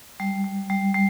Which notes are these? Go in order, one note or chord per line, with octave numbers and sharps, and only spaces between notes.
G3
G3
G3
G3